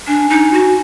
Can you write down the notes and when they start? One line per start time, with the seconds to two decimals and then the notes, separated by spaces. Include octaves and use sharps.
0.07 D4 G#5
0.30 D#4
0.53 F#4